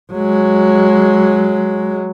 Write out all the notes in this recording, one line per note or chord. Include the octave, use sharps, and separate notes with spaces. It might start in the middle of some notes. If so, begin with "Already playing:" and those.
F#3 G#3